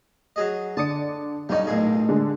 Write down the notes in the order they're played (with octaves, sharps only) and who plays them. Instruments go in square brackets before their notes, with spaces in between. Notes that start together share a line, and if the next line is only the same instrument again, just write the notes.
[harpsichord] F#3 G#4 D#5
[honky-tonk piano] D3 D5 C#7 [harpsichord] A5 D#6
[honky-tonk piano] B1 D#5 [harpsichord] G3 C#4 D#4
[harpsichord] A1 A#2 G#4
[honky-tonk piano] D3 G#3